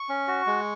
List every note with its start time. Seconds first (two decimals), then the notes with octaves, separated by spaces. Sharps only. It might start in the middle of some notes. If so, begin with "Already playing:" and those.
Already playing: C#6
0.09 C#4
0.28 F#4
0.47 G#3